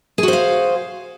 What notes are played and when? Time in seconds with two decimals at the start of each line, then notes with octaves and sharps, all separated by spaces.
0.18 G#4
0.23 F#4
0.28 C5
0.33 F5